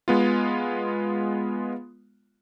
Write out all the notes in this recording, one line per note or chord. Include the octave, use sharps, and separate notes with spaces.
G#3 B3 F4